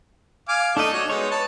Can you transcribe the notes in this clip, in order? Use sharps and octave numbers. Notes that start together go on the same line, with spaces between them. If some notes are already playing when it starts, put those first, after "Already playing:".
F5 G#5 D6
A3 D4 D#4 A4 D#5
F#4 C#5
G#3 B3 D#4 C#5
B4 A5